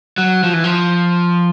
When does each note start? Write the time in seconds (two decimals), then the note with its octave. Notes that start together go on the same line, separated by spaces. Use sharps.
0.18 F#3
0.43 F3
0.53 E3
0.64 F3